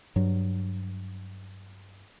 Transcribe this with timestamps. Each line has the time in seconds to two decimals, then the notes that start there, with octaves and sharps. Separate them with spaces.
0.16 G2 F#3